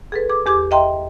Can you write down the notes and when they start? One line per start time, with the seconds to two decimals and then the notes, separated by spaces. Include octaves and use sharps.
0.12 G#4 A4 B4
0.30 G#4 D6
0.46 E2 G4 D6 G#6
0.71 D#5 E5 G5 A#5 C6